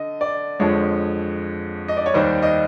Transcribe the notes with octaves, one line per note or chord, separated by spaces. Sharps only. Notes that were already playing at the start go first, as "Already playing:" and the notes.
Already playing: D3 D#5
D5
F2 D3 F3 G#3 C#5
D#5
D5
C#5
D#2 D#3 G3 C5
D#5